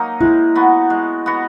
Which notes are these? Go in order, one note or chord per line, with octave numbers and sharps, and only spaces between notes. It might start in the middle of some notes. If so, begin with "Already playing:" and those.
Already playing: F#3 A#3 D#4
G#3 E4
B3 F#4
G#3
B3 F#4